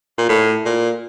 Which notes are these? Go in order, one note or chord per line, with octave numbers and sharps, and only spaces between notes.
A#2
A2
A#2